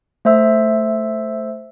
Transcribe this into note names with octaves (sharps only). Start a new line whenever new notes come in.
A3 C5 E5 E6